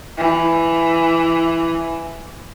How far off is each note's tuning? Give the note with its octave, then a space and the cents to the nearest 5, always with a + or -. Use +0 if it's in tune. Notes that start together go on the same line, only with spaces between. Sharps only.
E3 +10